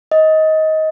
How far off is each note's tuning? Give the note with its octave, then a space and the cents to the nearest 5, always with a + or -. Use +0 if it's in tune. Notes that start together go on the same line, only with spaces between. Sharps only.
D#5 +20